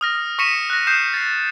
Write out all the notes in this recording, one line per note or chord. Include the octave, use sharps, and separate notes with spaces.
D#6 F6 A#6
C#6 A#6 B6 C#7 D#7 E7
F#6 A#6
D#6 G6 A#6 C7 E7
A6 C7